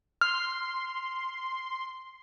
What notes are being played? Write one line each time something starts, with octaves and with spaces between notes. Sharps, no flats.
C6 F6